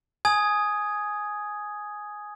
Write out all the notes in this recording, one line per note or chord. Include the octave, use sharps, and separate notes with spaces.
G#5 D#6 G#6